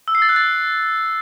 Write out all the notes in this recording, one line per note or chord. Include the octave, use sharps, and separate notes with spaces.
E6
C7
A6
F#6
A6